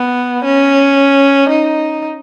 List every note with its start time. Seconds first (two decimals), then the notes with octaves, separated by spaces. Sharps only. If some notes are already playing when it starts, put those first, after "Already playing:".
Already playing: B3
0.44 C#4
1.49 D#4